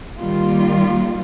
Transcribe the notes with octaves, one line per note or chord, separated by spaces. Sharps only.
D#3 G3 A#3 F4